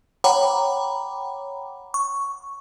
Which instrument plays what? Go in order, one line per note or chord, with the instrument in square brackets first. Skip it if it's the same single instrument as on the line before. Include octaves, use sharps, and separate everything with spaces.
[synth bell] C#5 F#5 G5 A#5 B5 D6
C#6